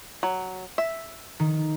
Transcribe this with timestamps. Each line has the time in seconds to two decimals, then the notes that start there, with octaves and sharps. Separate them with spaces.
0.23 F#3
0.78 E5
1.40 D#3